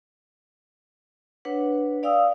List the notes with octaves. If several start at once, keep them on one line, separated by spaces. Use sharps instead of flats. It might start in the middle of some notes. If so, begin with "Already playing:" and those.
D4 B4 C#5 F#5
D5 F5 G5 D#6 E6